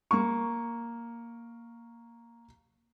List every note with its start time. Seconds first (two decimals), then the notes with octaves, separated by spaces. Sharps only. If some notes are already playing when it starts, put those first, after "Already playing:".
0.11 A#3 C#6